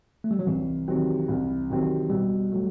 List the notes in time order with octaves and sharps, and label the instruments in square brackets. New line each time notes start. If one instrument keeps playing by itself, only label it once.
[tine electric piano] A3
G3
F#3
[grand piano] C2 [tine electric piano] E3
[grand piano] C3 D#3 F#3 C4
C2
C3 D#3 F#3 C4
[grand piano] B2 [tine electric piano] G3
[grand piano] F#3 A3